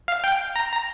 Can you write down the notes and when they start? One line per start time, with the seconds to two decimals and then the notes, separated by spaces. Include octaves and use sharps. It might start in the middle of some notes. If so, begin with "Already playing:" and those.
0.08 F5
0.24 G5
0.56 A#5
0.72 A#5